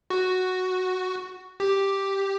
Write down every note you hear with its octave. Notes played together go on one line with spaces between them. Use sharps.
F#4
G4